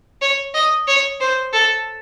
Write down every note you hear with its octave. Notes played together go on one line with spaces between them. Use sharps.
C#5
D#5
C#5
C5
A4